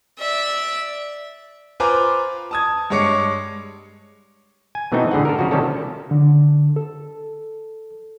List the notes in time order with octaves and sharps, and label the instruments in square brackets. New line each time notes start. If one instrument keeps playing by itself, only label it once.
[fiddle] D5 E5
[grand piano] F4 B4 C5 G#5 A#5 D6
A5 D#6 G#6
G2 G#3 C#5 D6 C#7
[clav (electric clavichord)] G#5
B2 E3 A3 C4 D#4 F#4
A2 D3 G#4 F#5
A4 A#4
C#3 F3 F#4
C3 D#3 G3 C#4 A4
[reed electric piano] D3
A4